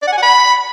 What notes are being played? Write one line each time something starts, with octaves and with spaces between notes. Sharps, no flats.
D5
F#5
G#5
F#5
B5